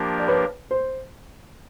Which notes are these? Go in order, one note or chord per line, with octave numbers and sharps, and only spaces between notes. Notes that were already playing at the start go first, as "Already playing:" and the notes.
Already playing: F3 A#3 D4 G4 A#4
D5
B4 C#5
C5